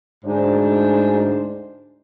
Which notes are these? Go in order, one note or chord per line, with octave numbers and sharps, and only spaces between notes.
D2 G#2 D4 C5